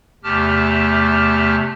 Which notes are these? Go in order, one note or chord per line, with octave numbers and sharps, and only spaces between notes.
E2 C3 A3 G4 A5 F6